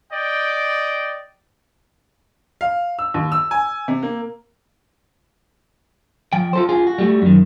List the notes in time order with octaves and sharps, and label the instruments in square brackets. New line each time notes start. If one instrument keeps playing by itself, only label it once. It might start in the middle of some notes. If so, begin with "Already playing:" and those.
[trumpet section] D5 D#5 G5
[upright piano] F5
E6
D#2
E6
G#5
C3
A#3
[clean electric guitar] F3 G5
F4 A4 C5
F4 G#4
F#4
G3 A3 F#4
F#2 D#3